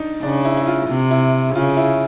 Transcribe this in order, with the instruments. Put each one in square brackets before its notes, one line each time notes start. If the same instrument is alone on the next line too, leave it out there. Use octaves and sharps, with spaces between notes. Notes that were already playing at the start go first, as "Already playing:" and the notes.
Already playing: [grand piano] D4 D#4
[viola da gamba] C#3 [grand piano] D4
[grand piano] E4
E4
F4
[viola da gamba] C3
[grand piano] E4
[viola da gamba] C#3 [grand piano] F4
[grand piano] E4